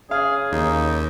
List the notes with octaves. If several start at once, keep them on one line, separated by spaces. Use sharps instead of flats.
C#3 G#4 F5
D#2 D#4